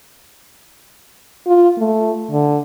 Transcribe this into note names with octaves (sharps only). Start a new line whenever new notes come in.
F4
A3
D3